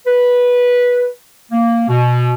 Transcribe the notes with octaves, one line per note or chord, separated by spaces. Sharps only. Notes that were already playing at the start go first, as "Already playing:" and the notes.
B4
A#3
B2